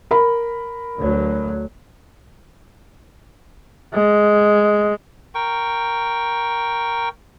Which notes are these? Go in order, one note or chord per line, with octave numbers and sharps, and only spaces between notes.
A#4 B5
D2 F#3
G#3
A#4 G5 C#6